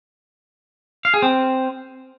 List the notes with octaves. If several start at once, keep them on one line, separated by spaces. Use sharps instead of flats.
F5
G#4
C4